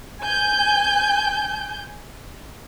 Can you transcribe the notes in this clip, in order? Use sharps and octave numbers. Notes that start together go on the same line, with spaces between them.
G#5 G6